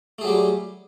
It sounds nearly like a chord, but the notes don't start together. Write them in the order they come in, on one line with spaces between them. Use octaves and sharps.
A3 G#4 F#3 G4 G3